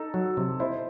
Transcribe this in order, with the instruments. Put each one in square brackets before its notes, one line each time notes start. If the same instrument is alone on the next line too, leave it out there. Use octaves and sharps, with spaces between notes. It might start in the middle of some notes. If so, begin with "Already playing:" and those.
Already playing: [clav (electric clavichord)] D#4 [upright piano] A4
[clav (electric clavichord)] F#3
C3
[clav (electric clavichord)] E4 [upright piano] C5 D#5